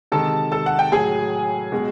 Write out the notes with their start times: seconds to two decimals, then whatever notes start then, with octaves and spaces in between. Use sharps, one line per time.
0.12 C3 D#3 G#3 A4 A5
0.52 A4 A5
0.66 F#5
0.79 G5
0.92 A2 F#3 G#4 G#5
1.72 B2 G#3